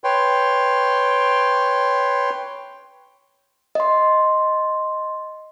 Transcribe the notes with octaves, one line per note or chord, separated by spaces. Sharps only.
B4 C#5 G5 C6
D#5 C6